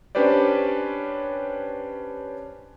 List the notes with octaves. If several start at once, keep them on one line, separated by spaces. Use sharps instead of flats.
C#4 D4 G4 B4 C5 D5